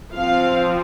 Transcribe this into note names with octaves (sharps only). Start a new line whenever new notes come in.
F3 C4 F5